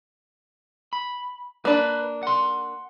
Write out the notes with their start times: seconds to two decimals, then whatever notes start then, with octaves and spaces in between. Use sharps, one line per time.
0.93 B5
1.65 A#3 D4 B4 B5
2.23 F#5 C6